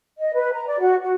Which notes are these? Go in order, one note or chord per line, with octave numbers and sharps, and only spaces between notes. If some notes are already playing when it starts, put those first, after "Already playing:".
D#5
B4
A#5
D5
F#4
F#4